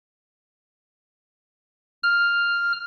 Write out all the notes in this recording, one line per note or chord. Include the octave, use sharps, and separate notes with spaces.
F6